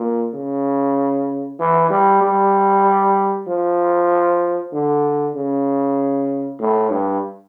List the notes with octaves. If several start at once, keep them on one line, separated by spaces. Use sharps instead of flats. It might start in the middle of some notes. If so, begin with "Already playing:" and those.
Already playing: A#2
C#3
E3
G3
G3
F3
D3
C#3
A2
G2